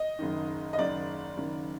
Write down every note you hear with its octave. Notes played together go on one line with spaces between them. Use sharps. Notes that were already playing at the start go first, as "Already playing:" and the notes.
Already playing: D#5
F#1 F#2 D#3
D#5
F#1 F#2 D#3 D5
F#1 F#2 D#3